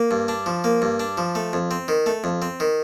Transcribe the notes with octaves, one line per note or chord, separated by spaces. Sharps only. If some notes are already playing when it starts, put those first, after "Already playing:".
Already playing: A#3
G2
D4
F3
A#3
G2
D4
F3
A3
F2
C4
D#3
A3
F2
C4
D#3